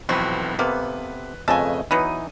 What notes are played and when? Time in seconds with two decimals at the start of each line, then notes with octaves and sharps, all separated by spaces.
0.09 B1 F2 E3 C4 F#4 B4
0.59 C3 A#3 B3 A4 B4
1.48 F2 C#3 A3 A4 B4 D#5 E5 G#5
1.91 E3 F#3 B3 D#4 D#7